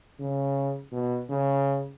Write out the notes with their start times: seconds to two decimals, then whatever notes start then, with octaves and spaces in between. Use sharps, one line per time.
0.20 C#3
0.92 B2
1.29 C#3